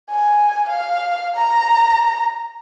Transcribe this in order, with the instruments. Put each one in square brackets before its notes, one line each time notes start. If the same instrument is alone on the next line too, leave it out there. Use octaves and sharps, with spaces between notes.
[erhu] G#5
F5
A#5